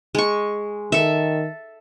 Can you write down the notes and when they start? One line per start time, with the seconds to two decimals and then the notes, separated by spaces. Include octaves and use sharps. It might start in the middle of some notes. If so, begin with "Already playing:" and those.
0.15 G#3 C#6
0.92 D#3 A4 E5